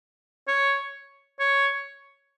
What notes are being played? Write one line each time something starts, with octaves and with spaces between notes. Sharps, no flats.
C#5
C#5